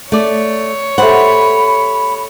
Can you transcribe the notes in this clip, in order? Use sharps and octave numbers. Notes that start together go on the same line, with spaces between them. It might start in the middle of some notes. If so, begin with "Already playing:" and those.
A3 C#5 D5
A3 G4 C5 F#5 B5